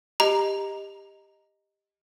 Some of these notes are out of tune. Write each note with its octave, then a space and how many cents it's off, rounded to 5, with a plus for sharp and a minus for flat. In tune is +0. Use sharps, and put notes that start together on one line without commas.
G4 +15 D#5 +0 A#5 +0